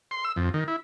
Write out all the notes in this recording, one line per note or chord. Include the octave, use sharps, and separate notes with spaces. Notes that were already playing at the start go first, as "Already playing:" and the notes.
C6
E6
F2
D#3
E4